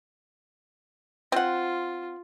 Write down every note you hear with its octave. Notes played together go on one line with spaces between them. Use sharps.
C4 F4 F#5